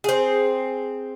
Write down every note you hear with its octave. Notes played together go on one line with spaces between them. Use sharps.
C4 G#4